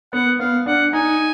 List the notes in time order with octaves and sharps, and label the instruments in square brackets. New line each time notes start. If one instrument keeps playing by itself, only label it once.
[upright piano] B3 [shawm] F#5
[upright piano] B3 [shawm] F5
[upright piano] D4 [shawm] F#5
[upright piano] D#4 [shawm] G#5